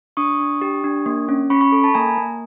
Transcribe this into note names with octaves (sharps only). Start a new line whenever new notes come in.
D4 C#6 D#6
D4
G4
D4
A#3
C#4
C#4 B5 C#6
B5 C#6
A4
A5 B5
A#3 G#5 A#5
A#3